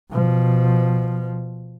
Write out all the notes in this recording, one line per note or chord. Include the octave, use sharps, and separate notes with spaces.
B2 F3